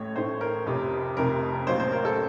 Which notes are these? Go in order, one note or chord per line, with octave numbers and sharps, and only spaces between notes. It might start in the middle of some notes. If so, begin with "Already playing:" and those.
Already playing: A1 A2 A3 C#5
A1 A2 A3 C5
A#4
F1 F2 C3
F1 F2 C3 A#4
A1 A2 F#3 A#3 C5
C5
A#4
A4